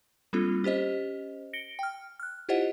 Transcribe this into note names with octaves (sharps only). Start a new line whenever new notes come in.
G3 A#3 C4 D4 F4 A4
C#4 G4 C5 D#5
A#6 C#7 D7 G7
G5 F6
F6 F#6
E4 F4 G4 C5 D#5 F#5